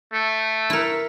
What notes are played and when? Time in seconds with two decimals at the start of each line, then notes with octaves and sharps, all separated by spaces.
0.13 A3
0.70 E4 A#4